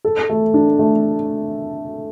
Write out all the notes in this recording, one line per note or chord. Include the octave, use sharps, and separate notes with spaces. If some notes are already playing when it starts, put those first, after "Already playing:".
A4
A3
D4
A3